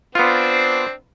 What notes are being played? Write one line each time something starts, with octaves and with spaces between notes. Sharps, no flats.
B3 C4 D4 F4 C5